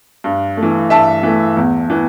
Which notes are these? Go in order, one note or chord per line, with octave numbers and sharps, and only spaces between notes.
G2
A3
E3
G2 E5 A5
E3 A3
E2
E3 B3